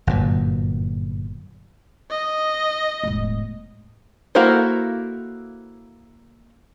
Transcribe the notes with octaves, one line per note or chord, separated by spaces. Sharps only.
G1 F#2 A#2
D#5
E1 A2
A#3 E4 F#4 A4 C5